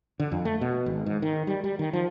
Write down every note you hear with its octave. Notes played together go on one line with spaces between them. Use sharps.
D3
F2
A3
B2
G#1
G#2
D#3
G3
G3
D#3
F3